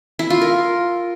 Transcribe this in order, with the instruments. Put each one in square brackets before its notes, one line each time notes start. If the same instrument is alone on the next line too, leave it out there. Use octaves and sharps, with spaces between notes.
[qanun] E4
F4
A#4